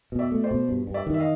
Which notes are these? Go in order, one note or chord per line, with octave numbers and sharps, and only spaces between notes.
B2
D5 E5
A3
C5 D5
B2
G2
G2
D5 E5
D#3
E5
D#5 F5